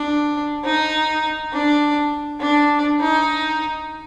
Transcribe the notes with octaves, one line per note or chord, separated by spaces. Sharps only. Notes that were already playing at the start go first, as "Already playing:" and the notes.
Already playing: D4
D#4
D4
D4
D#4